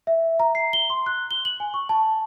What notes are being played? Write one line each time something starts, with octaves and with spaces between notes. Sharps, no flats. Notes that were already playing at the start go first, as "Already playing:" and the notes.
E5
A#5
C7
G7
C6
F#6
G7
F#7
G#5
C#6
A5